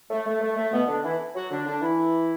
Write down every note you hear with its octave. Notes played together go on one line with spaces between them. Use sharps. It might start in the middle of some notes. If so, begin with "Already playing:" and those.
A3
A3
A3
A3
B2 B3
D3 D4
E3 E4
F#3 F#4
D3 D4
D3 D4
E3 E4